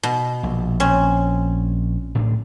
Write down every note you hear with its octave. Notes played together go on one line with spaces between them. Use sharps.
B2
A#1
C4 C#4
A2 C4 D4